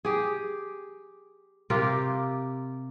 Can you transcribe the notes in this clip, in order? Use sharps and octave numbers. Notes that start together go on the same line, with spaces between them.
G4 G#4
C3 F4 G4 A#4